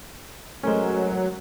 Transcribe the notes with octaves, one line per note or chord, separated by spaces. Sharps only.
F#3 G#3 A3 C#4 A#4 C5